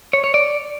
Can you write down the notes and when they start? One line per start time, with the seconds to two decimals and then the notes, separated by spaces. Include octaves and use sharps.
0.13 C#5
0.24 C#5
0.34 D5